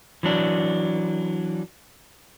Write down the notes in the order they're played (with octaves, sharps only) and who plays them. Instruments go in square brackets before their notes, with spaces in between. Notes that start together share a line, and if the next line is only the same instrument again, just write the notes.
[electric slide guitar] E3 F#3 D4